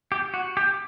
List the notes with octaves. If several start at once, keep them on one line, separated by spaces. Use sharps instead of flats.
G4
F#4
G4